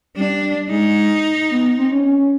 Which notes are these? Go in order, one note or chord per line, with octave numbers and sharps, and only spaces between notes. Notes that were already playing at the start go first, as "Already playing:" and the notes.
G3 D4
G#3 D#4
B3
C4
C#4
C#4
C#4